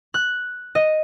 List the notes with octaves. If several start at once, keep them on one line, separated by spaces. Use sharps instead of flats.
F#6
D#5